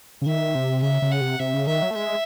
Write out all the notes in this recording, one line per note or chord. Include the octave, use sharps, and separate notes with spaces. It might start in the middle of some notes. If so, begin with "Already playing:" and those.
C#3
D#3 E5
C3
C#3 E5
C#3
F#5
C3
C3 E5
C#3
D#3 E5
F#3
A3
G#3 E5